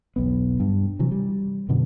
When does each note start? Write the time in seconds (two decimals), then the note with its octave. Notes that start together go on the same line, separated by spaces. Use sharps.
0.16 E1 B1 B3
0.60 G2
0.99 C3 E3 F#3
1.11 G3
1.69 F#2 B2 D3